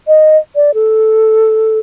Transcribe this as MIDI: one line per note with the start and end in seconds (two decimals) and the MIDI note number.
0.08 0.37 75
0.56 0.71 74
0.74 1.79 69